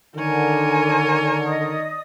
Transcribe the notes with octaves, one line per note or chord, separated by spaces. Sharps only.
D3 D#3 A#4 C#5 G#5
D5 D#5 D#6